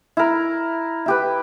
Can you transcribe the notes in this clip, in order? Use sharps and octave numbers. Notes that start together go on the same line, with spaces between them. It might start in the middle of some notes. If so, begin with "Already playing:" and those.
E4 A#4
E4 G4 B4